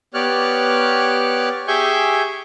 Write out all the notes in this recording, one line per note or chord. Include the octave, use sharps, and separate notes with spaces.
B3 G4 C#5 D5 F6 F#6
G4 G#4 E5 G#5 C#6 G6